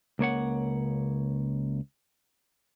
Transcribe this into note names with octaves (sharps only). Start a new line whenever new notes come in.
C#2 A#3 C#5 F#5